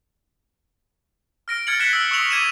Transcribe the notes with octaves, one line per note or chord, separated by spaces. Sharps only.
F6 A#6 D7
F6 G#6 A6 C#7 F#7
F#6 G#6 B6 C#7 E7 G7
E6 F6
C#6 D#6 E6 F7 F#7
D6 G#6 D#7 E7